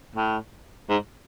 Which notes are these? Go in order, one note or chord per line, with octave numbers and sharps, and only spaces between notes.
A2
G#2